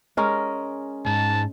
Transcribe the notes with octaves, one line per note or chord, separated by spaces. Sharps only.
G#3 C#4 A#4
G#2 A5